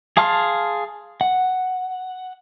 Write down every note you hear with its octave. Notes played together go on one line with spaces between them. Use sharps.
G#4 F5 A5 C6 F6
F#5